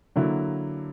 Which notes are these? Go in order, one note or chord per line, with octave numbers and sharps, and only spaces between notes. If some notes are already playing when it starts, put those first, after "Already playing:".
D3 F#3 A#3 E4